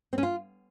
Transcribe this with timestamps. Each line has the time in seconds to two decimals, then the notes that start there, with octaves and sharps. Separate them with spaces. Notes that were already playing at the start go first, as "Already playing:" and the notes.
0.13 C4
0.18 C#4
0.23 F4